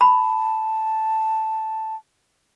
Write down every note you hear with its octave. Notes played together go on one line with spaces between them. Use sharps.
A5 B5